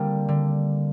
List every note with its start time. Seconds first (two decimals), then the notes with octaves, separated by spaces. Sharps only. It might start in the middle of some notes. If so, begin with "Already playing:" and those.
Already playing: D3 G3 A#3 C4
0.29 D3